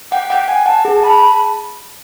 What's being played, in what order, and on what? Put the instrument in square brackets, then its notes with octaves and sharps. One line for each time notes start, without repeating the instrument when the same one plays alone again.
[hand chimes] F#5 [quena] G5
[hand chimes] F#5 [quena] G5
[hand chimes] F#5 [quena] G#5
[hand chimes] F#5 [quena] A5
[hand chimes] G#4
[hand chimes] A5 [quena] B5